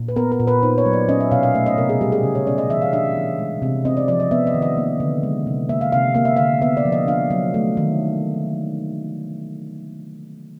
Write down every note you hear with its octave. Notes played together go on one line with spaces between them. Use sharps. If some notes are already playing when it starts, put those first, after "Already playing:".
Already playing: A#2
B4
B3 A#4
A#4
A#2
B4
D#4 C5
C#5
F#3
D5
C#4 D#5
E5
B2 F5
F5
A3 E5
D#5
C3 A#4
G#4
G3 G4
G#4
C#3
C#5
C#4 D5
D#5
E3 E5
F5
D4 E5
E3
G#3
C3
C4 D#5
D5
F3 D5
D#5
B3 E5
D#5
D#3
D#5
A#3
D3
G#3
C3
A#3 E5
F5
C3 F5
A#3 F5
E5
D3 F5
B3 E5
D5
F3
D#5
D4 F5
F#3
A3
D#3